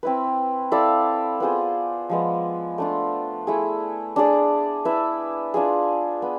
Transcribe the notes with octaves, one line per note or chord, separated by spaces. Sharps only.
C4 E4 B4
E4 A4 D5 F5
B3 F4 G#4 C5
F3 G#3 B3
A3 D4 F4
A3 E4 G#4
D4 G#4 D5
E4 B4 E5
D4 F4 G#4
B3